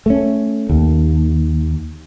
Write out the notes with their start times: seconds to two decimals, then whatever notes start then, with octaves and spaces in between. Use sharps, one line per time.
0.06 A3 C#4
0.70 D#2